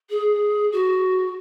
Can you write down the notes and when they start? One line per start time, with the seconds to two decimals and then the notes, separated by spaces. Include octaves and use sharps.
0.10 G#4
0.72 F#4